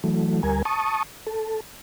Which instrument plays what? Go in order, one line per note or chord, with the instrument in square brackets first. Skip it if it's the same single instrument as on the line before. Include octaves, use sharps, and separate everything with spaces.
[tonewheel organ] E3 F#3 A3
D2 G3 A#4 G#5
A5 C#6 D#6
A4